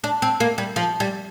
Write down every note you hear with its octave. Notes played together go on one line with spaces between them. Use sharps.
D4
C4
A#3
G3
F3
G3